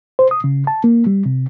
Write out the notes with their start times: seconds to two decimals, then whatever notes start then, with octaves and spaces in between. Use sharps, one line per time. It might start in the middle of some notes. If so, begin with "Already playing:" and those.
0.19 C5
0.31 D#6
0.44 C#3
0.67 A5
0.84 A#3
1.07 G3
1.26 C3